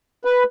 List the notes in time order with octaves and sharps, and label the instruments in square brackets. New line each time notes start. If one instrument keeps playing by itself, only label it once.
[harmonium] B4